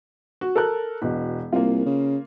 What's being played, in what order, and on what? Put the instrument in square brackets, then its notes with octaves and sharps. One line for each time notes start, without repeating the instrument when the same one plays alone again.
[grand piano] F#4
A4 A#4 F#6
E1 B2
[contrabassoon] C2 [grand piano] A#3 F4
[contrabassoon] C#3